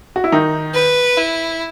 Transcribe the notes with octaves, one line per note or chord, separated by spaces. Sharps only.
F#4
E4
D#3 D#4
B4
E4